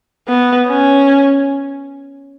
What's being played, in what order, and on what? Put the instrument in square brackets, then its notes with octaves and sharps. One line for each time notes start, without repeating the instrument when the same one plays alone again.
[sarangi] B3
C#4